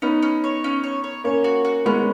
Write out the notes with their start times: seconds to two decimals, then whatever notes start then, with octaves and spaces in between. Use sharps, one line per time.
0.02 B3 C#4 D#4
0.22 C#4
0.44 C#5
0.64 C#4
0.84 C#5
1.04 C#5
1.24 A#3 C#4 C#5
1.44 F#4
1.65 F#4
1.85 G#3 B3 C#4